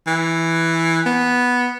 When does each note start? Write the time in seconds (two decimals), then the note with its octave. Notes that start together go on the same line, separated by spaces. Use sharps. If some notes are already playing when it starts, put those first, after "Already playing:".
0.07 E3
1.06 B3